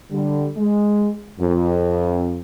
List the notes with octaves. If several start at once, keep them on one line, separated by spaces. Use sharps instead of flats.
D3 G3
G#3
F2